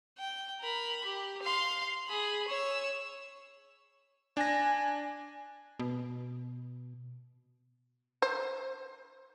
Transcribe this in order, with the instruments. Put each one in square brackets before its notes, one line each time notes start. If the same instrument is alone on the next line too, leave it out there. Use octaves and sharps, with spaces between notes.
[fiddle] G5
A#4 B5
G4
F5 C6
G#4 B5
C#5 E6
[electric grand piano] D4 A#6 [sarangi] G#5
[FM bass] B2
[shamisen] C5